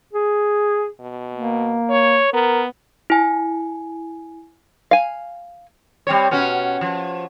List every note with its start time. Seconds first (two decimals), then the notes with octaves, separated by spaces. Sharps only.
0.13 G#4
1.00 B2
1.34 A#3
1.90 C#5
2.33 B3 A#4
3.10 E4 G#5
4.91 F5 G#5
6.07 G3 C4 C#5
6.31 B2 C#4 F#4
6.81 F3